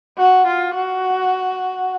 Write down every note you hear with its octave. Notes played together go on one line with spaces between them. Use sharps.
F#4
F4
F#4